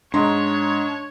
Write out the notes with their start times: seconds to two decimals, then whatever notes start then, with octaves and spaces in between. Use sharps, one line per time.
0.14 G#2 D4 C#5 A#5 C6